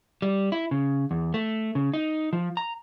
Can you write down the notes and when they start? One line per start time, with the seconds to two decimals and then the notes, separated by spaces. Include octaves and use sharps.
0.22 G3
0.52 E4
0.71 C#3
1.11 E2
1.34 A3
1.75 C#3
1.94 D#4
2.33 F3
2.57 A#5